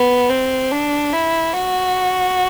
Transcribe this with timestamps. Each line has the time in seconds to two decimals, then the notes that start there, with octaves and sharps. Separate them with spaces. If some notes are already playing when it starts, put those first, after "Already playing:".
Already playing: B3
0.30 C4
0.72 D4
1.13 E4
1.54 F#4